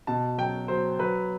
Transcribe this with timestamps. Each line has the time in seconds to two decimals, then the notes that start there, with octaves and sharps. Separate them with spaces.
0.07 B2 A5
0.38 F#3 G5
0.68 F#3 C5
0.99 F#3 B4